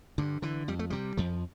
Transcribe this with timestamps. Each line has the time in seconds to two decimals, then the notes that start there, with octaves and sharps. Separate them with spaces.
0.18 G2 D3
0.42 D3 E3
0.68 F2 G3
0.79 A3
0.90 C3 G3
1.17 F2 F3